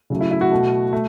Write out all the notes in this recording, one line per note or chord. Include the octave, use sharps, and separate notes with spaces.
C#3 F#3 A3
E4
E4
F#4
B2 A3
A3